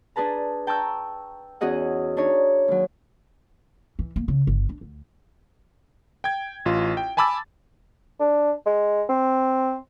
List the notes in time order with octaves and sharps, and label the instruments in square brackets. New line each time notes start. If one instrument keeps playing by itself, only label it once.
[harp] D4 G#4 B4 A5 A#5
G5 A5 A#5 C#6 E6 G6
E2 C#4 F#4 G#4 D#5 F#5
D4 D#4 C#5
D#2 F#3
[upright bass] E3
A#3
C#3
G1
D4
D2
[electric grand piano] G5 G#6
A1 F4
G5
G#5 A5 B5 D6 E6 A6
[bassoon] D4
G#3
C4